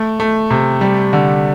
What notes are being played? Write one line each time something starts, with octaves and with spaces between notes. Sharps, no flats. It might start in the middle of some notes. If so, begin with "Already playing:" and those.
Already playing: A3
A3
C3
G3
D3